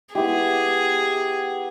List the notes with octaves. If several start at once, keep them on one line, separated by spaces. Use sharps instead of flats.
B3 E4 G4 G#4